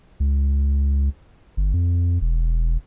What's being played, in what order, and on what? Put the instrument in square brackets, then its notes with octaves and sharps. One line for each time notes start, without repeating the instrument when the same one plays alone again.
[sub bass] C#2
G1
F2
E1